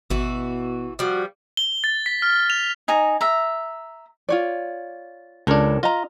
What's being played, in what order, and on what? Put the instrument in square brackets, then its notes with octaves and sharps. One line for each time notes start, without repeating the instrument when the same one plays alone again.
[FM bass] G#1 [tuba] B2 [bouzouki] E3 F#4
[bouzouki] F3 G3 [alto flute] F#4
[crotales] G7
A6
B6
F6
F7
[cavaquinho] D#4 G#5 A#5
E5 A#5
[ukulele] F4 C#5 D5
[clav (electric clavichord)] C#2 D4 [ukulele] A4 A#4 C#5
[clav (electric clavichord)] F4 [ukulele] D#5 A#5